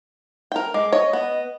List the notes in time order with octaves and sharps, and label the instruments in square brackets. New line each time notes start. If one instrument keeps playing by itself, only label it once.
[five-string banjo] A#4 G5
[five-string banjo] G#3 [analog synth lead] D6
[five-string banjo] C#5 [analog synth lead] D#5
[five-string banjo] B3